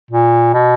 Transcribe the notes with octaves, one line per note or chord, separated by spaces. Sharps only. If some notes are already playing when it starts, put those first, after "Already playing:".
A#2
B2